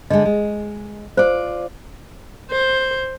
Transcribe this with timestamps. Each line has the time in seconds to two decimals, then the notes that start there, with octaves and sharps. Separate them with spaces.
0.10 D3 G#3 D#5
0.25 G#3
1.17 F4 C5 D5
2.51 C5